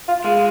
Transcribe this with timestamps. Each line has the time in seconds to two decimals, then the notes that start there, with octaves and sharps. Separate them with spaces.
0.08 F4
0.24 G#3 F4